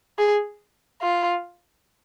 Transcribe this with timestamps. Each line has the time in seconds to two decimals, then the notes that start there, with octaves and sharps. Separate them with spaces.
0.18 G#4
1.01 F4